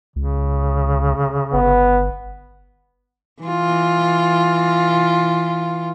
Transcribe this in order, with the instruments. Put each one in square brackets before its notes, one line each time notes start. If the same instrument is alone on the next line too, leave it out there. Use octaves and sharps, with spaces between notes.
[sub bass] C#2 [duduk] C#3
[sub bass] G1 [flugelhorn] B3
[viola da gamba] E3 F4